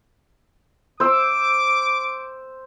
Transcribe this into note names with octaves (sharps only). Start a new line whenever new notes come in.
C5 D6 E6